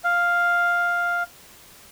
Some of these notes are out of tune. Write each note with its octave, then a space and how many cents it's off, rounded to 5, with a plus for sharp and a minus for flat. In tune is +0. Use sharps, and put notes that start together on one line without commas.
F5 +0